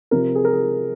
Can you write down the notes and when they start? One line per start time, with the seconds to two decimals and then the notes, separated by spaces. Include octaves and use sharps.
0.11 C3 F3 A#4
0.35 G#4
0.45 A#4
0.53 G#4